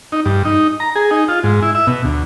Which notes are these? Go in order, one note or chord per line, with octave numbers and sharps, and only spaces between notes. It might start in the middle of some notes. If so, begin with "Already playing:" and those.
D#4
G2
D#4
A#5
G#4
D#4
F4
G#2
E4
E5
B2
D2